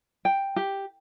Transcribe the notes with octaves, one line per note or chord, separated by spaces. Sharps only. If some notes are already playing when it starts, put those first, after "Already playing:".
G5
G4